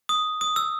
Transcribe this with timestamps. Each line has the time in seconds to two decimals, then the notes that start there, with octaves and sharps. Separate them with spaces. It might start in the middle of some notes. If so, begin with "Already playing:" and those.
0.09 D#6
0.41 D#6
0.56 E6